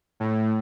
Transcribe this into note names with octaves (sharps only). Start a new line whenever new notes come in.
A2